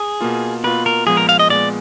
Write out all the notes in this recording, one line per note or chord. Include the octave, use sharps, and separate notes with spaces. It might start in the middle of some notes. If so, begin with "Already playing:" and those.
Already playing: G#4
B2 A#3 F4
B2 A#3 F4 B4
A#4
A#2 F3 G#3 B3 G#4
A#4
F5
D#5
A#2 F3 G#3 B3 D5